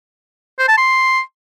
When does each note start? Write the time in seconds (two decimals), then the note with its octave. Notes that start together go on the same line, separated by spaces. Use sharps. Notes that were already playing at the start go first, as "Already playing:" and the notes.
0.59 C5
0.68 A5
0.78 C6